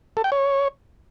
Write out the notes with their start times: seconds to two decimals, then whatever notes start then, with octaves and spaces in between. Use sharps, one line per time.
0.17 A4
0.24 G5
0.32 C#5